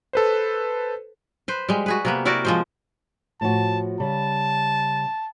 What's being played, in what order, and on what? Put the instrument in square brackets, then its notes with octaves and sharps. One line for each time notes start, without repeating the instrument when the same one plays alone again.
[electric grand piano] A4 B4 C5
[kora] B4 C5
G3 G#3
F#4 G#4 B4
C3 A#3 B3
E4 F#4 A#4 D5
F3 G#3 C5
[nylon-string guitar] A2 F3 F#4 [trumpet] A5
[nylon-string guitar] C#3 G3 [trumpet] A5